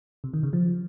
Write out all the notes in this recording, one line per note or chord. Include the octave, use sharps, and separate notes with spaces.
C3
D#3
C#3
F3